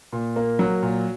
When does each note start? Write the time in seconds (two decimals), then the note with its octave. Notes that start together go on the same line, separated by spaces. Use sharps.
0.13 A#2
0.36 A#3
0.59 F#3
0.82 A#2